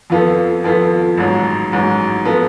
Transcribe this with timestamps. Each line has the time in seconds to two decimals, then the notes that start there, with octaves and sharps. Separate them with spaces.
0.10 F2 F3 B3 F4 A4
0.64 F2 F3 B3 F4 A4
1.17 A1 G#2 F#3
1.72 A1 G#2 F#3
2.25 F3 B3 F4 A4